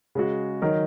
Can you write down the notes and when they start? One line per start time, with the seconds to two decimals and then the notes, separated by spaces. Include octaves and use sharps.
0.15 C#3 G#3 F#4
0.62 D#3 F#3 D#4 A#4